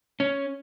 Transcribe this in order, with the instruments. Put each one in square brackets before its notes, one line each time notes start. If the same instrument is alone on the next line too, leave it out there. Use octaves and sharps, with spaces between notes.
[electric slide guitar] C#4